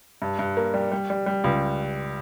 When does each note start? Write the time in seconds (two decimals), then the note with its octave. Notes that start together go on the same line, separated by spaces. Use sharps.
0.22 G2
0.39 G2
0.57 A#3
0.74 G3
0.92 G3
1.10 G3
1.26 G3
1.44 C#2